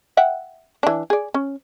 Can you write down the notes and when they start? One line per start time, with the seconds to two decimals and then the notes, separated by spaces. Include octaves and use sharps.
0.17 E5 F#5 G5
0.83 E3 D4
1.10 G#4 D5
1.34 C#4